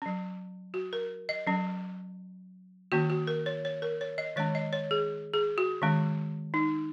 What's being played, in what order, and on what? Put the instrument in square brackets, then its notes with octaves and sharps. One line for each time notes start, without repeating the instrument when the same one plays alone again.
[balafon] F#3 C#4
F#4
A#4
D#5
F#3 C#4
D#3 A#3 C#4 F#4
F#4
A#4
C#5
C#5
A#4
C#5
D#5
D#3 G#3 C#4 C#5
D#5
C#5
G#4
G#4
F#4
D#3 G#3 C#4
D#4